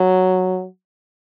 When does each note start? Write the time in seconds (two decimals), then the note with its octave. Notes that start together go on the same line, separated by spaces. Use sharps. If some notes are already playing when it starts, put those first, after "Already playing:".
Already playing: F#3